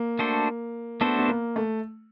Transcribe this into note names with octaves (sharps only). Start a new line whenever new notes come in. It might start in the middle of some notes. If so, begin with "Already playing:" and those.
Already playing: A#3
A3 D4 F#4 A4 C5
A3 B3 D4 F#4 A4 C5
B3
A#3
A3